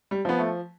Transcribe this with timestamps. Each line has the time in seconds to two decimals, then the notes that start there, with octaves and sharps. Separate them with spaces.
0.11 G3
0.25 F3 B3
0.39 A3